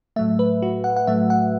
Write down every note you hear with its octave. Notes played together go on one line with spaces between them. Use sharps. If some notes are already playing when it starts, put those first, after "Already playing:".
A2 F#3 A3 E5
B4
F#4
F#5
F#5
A2 F#3 A3 E5
F#5